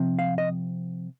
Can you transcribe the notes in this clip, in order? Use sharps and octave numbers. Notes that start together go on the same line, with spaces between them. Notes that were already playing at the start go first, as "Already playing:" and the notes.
Already playing: C3 F3 C4
F5
D#5